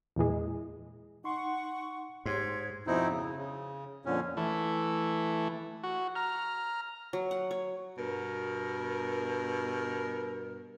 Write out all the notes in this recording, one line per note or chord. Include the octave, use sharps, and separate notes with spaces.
E2 A#2 E3 G#3
D#4 F#5 C6 C#6
G#2 G4 C#5 C6 G#6
F2 B2 C4 D#4 E4
C#3
C#3
F2 A#2 D3 C#4
E3 A3
F#4
A#5 F6
F#3
F#5
C#5
G2 B2 A#4